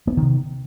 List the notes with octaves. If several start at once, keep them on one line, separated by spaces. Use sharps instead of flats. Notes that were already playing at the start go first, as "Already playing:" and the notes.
C3 D#3 A#3 B3